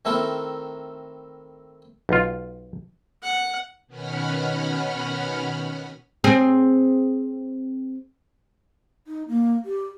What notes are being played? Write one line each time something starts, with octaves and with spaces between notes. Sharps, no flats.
D#3 A3 C4 E4 A4 A#4
B1 F4
F#5
B2 D#3 C#4 F#5 B5 F6
C4 G#4
D#4
A#3
G4